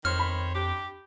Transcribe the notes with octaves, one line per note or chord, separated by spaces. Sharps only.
F2 D#3 C5 C#5 F6
B5
D4 G4